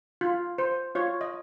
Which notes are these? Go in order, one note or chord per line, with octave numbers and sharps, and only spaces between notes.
F4
C5
F4 C#5
D#5